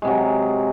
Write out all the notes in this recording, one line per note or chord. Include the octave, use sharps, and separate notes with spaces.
C3 F#3 G#3